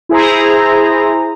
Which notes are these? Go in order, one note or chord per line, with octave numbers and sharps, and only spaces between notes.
E4 G#4 C5 A#5